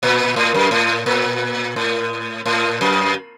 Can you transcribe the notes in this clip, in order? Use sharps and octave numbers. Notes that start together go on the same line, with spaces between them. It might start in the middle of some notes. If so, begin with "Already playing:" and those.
A#2
A2
F#2
A2
A#2
A2
A2
F#2